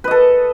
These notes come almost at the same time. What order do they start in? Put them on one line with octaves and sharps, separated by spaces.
B4 D#5 A4